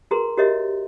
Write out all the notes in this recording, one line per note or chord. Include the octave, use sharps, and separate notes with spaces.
F#4 G#4 A#4 B4 A#5 C6
F#4 G4 A#4 C#5 D#5 E5